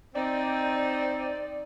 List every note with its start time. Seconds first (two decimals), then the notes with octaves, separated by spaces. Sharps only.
0.15 C4 D#4 D5